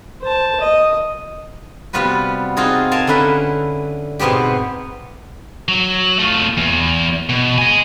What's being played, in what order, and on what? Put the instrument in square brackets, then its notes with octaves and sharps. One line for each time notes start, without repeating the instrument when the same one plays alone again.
[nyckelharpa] C5 A5
D#5
[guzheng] C3 G3 B3 F4 F#4 B4
C4 D#4 F4 F#4 G#4
A#4 F5 G#5 A5 C6
D3 C#4 E4 B4 E5
G#2 B2 B3 C4 G4
[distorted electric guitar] F#3
A3 F4
E2
B2
D#5 G#5